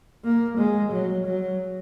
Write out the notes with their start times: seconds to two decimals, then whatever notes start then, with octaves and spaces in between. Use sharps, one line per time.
0.24 A#3
0.58 G#3
0.92 F#3
1.26 F#3